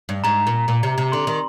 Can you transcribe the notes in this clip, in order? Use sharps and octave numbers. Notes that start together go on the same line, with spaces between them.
G2
G#2 A#5
A#2
A#2
C3
C3
D3 C6
D#3